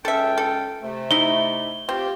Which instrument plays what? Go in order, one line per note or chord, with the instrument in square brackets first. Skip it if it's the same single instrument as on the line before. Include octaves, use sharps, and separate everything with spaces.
[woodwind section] C#2 C#4 G5 [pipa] A4 E5
[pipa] A4
[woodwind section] C3 A3
[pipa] D#4 E4 [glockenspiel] G7
[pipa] C4 [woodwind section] F4 G4